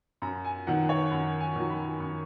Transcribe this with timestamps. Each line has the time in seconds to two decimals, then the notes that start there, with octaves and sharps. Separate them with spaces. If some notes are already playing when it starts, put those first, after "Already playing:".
0.22 F#2 A#5
0.45 G#5
0.67 D#3 F#3 F#5
0.89 C#5
1.11 F#2 F#5
1.41 G#5
1.56 D#3 F#3
1.70 B5
2.00 F#2 C#6